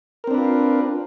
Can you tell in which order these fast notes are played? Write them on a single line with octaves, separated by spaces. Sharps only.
A#4 C4 D4 B4 F4